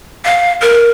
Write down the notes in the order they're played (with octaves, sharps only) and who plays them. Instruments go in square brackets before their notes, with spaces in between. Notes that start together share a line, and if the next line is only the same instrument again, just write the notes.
[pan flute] F5
A#4